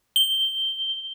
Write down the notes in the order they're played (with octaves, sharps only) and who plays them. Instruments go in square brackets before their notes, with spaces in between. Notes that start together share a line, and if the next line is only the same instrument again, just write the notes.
[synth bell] G7